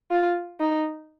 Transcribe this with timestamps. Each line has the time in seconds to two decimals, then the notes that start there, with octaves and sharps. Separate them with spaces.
0.11 F4
0.60 D#4